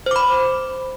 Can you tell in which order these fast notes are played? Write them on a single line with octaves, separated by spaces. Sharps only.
C5 D6 B5